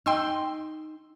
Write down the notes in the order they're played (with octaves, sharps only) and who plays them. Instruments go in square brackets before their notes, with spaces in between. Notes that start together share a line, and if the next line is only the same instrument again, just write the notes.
[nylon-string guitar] D#4 [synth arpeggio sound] G5 C6 E6